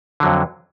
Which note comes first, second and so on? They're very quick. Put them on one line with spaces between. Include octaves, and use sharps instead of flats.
D3 F#3 F2